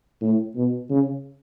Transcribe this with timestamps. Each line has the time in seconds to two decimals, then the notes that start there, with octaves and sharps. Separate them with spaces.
0.21 A2
0.56 B2
0.90 C#3